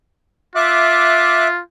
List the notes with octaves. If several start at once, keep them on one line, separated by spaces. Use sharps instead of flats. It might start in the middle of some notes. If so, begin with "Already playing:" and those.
F4 E5 D6 F#6